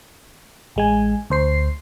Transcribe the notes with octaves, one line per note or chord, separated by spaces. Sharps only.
A1 G#3 G#5
D2 C5 C7